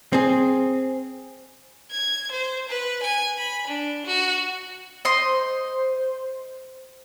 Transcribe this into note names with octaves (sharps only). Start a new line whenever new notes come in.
C4 G#4
G#6
C5
B4
G#5
B5
D4
F#4
C5 D#5 C6